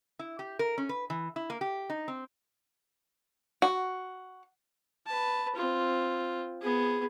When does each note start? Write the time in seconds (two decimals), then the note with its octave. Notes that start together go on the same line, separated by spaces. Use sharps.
0.19 E4
0.39 G4
0.59 A#4
0.78 C#4
0.89 B4
1.10 E3
1.36 E4
1.50 A#3
1.61 G4
1.90 D#4
2.08 C4
3.62 F#4
5.06 B4 A5
5.55 C4 F4
6.62 B3 G#4